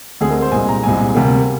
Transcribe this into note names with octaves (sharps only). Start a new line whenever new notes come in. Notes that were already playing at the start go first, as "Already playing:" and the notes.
D2 D3 G#3 C4 G#4
A#4
C5
C2 A#2 G#3 C4 G#5
A#5
C2 A#2 G#3 C4 G#5
D2 C3 G3 A#3